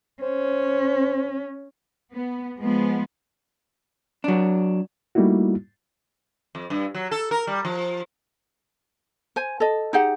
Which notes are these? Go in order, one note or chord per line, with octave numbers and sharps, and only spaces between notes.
C#4 C5
B3
F3 G#3 B3
F#3 D4
G3 A3 A#3 D#4 E4 F#4
F2
G2
F#3
A4
A#4
G3
F3
C5 G#5
A4 D#5
D#4 G4 G#4 F#5